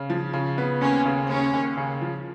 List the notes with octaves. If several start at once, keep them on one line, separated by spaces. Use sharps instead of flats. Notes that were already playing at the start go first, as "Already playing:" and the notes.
Already playing: C#3
F3
C#3
B3
D#2 C#4
C#3
D#2 C#4
D#2
C#3
F3